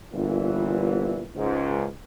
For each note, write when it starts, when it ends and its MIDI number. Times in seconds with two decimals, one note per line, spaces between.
0.13 1.26 31
0.13 1.26 46
0.13 1.26 52
1.36 1.85 37
1.36 1.85 44